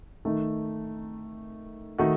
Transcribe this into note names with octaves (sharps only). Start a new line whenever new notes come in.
D#3 A3 D#4
D#3 A3 D#4 F#4